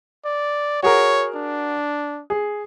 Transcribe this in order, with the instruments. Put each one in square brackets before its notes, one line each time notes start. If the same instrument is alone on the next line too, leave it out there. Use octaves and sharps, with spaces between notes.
[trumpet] D5
[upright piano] F#4 G#4 A#4 [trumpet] C#5
[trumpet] D4
[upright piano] G#4